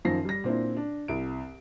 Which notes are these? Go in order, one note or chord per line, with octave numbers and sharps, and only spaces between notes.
F#2 D#3 F3 A#6 C7
G3 A#6
A#2 C4 D4 E4
D4
C2 E4 D7